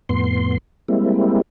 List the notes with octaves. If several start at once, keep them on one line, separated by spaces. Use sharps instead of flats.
F2 A2 B3 C6
G3 G#3 A#3 C4 E4